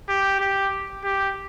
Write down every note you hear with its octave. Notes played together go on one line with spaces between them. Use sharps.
G4
G4
G4